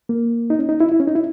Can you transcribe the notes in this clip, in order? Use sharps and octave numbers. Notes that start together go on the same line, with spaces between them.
A#3
D#4
C#4
D#4
E4
E4
C#4
D#4
E4